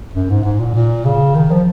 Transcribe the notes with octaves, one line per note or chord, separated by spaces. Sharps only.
F#2
G#2
G#2
A#2
A#2
C#3
D#3
F3